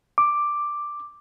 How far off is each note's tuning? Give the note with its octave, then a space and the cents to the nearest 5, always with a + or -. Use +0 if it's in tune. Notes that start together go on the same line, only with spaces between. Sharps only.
D6 +5